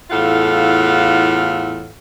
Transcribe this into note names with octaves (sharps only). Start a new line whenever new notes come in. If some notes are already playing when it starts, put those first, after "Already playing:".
E2 A2 F4 A4 F5 F#5